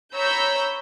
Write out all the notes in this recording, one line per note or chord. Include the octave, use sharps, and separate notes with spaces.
C#5 A#5 B5 E6 G6